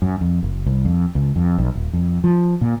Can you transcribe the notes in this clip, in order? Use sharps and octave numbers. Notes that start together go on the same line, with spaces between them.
F#2
F2
F#1
C2
F2
C#2
F2
B1
D#1
F2
F3
A#2